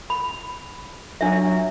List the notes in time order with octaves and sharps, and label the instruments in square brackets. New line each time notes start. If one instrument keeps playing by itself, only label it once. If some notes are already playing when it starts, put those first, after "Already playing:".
[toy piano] B5
[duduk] F#3 [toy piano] D4 E5